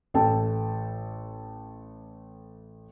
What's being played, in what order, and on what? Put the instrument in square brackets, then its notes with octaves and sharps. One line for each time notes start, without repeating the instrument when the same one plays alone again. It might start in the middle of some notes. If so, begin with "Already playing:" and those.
[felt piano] A1 A4 G5 A5